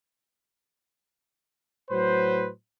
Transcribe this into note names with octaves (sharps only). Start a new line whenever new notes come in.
A2 F#3 B4 C5